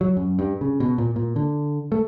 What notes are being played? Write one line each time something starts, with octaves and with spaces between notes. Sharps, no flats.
F#3
F#2
G2
C#3
B2
A#2
A#2
D3
A3